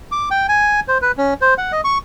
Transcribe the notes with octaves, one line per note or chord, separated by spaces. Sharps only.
D6
G5
G#5
C5
B4
C#4
C5
F#5
D#5
C#6